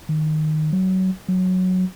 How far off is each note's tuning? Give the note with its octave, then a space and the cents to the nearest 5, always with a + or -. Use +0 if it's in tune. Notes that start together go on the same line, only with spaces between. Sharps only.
D#3 -10
F#3 +20
F#3 -5